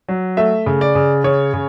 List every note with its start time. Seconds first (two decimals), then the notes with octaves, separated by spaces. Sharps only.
0.08 F#3
0.37 A3 E5
0.66 C#3
0.81 D5
0.95 C#3
1.24 C#3 C#5
1.54 C#3